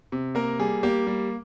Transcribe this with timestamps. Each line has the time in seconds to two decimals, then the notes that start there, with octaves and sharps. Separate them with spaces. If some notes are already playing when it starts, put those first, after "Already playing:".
0.12 C3
0.35 A#3 A#4
0.59 G3 G#4
0.83 A#3 G4
1.07 G3